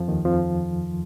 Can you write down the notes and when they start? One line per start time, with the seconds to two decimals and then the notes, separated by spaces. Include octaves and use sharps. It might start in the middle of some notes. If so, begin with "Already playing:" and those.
Already playing: F2 F3
0.08 D#2 D#3
0.25 F2 F3